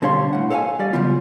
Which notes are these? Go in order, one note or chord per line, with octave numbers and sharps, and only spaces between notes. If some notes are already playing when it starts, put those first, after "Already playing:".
B2 D3 G3 C#5 F5 C6
A2 F#5
A4 C#5 E5 F5 G#5
G3 D5
C#3 F3 F#3 B3 F4